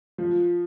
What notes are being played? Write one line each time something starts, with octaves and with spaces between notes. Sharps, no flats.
F3